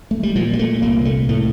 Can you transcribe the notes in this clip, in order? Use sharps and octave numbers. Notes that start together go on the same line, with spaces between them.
A3
G3
A#2 F3
G3
A3
C2 A#3
A3
A2 A3